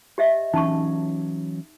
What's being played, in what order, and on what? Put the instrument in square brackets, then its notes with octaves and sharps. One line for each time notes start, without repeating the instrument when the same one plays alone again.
[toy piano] G4 D#5 E5
[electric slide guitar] E3 F#3 C#4 [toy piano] D#4 A5 C#6